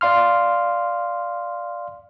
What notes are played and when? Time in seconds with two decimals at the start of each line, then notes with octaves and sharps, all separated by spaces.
0.01 D5 F5 C6 F6